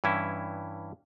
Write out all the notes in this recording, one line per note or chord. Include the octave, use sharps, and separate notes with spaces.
G2 E3 C#4 E4